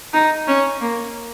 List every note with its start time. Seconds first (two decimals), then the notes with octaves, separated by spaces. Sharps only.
0.13 D#4
0.48 C#4
0.81 A#3